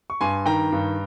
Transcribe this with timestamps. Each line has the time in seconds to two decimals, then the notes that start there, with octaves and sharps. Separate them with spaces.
0.10 C#6
0.21 G2 G#5 C6
0.46 D#3 G5 A#5
0.72 G2